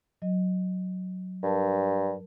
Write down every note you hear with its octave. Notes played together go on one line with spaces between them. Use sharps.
F#3 D#5
G2 A#4 A5